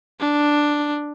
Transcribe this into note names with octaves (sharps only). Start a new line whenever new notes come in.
D4